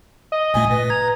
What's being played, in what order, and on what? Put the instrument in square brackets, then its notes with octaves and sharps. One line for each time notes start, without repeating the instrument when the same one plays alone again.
[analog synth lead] D#5
[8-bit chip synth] G#1 A#2 A3 [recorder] G#5
[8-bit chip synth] A#2 [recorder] B4
[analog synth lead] A#5 [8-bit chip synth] G#6